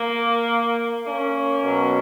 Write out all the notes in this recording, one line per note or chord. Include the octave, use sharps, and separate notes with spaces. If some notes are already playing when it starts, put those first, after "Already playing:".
Already playing: A#3
A#3 C#4
B2 F#3